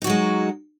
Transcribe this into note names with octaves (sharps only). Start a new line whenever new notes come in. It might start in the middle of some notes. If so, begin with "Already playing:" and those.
F#3 G#3 D#4 F#4